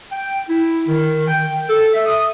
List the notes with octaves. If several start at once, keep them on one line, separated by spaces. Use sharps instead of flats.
G5
E4
D#3
G5
A4
E5
D#6